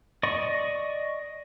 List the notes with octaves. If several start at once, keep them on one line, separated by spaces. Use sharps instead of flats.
D5 D#5 C#6